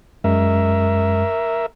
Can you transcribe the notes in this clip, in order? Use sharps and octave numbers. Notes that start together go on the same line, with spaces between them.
F#2 G#3 A#4 E5